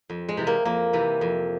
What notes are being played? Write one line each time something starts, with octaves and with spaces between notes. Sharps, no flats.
F2
G#3
C3 E3
A#3
F2 A#3
C3 E3
F2